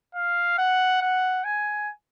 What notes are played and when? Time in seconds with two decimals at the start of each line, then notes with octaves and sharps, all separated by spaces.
0.15 F5
0.58 F#5
1.02 F#5
1.44 G#5